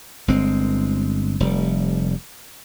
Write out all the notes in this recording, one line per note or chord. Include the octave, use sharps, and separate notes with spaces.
G1 G#3 C4
F1 G3